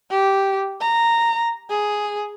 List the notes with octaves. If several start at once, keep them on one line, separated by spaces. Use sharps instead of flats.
G4
A#5
G#4